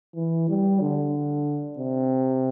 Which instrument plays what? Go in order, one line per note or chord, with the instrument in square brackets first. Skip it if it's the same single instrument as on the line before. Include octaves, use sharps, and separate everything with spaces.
[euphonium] E3
G3
D3
C3